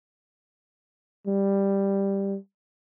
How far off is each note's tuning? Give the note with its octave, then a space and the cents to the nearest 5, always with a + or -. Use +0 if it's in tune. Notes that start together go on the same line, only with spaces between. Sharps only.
G3 +5